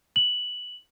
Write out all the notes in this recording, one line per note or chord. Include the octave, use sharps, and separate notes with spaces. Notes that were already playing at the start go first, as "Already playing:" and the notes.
F#7